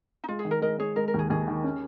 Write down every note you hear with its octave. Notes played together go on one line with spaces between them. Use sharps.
D#4
G#3 F4
G#4
D#3
A#4
G#3 A#4 D#5
G#3 G#4 C#5
G#3 A#4
A#4
D#2
G#4
D#2 G#4
D#3
C#4